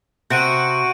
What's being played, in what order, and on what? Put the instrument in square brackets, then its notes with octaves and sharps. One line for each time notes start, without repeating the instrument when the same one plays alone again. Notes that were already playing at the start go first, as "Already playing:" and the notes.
[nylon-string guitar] C3 [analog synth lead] F#4 [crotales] G6 D7 D#7